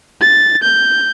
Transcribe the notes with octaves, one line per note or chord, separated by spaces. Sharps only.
A6
G6